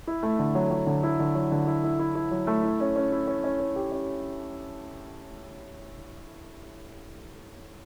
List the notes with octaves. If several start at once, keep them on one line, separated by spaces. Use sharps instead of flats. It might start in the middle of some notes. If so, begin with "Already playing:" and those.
E4
A3
D3
F#3
F#3
D3
E4
D3
F#3
D3
E4
E4
E4
E4
F#3
A3
E4
C#4
C#4
E4
C#4
C#4
C#4
G4
C#4